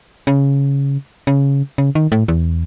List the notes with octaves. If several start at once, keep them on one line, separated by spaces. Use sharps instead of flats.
C#3
C#3
C#3
D#3
A2
E2